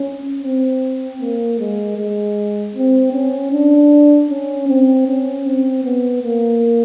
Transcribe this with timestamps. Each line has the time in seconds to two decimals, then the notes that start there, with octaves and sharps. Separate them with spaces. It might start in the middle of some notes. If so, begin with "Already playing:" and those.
Already playing: C#4
0.43 C4
1.21 A#3
1.59 G#3
1.98 G#3
2.75 C4
3.13 C#4
3.52 D4
4.30 C#4
4.68 C4
5.07 C#4
5.46 C4
5.84 B3
6.23 A#3